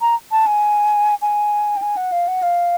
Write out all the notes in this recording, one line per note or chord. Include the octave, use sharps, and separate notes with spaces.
A#5
A5
G#5
G#5
G5
G#5
F#5
F5
F#5
F5